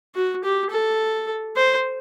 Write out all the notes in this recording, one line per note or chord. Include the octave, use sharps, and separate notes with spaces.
F#4
G4
A4
C5